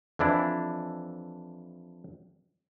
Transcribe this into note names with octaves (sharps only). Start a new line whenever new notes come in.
F2 E3 D4 E4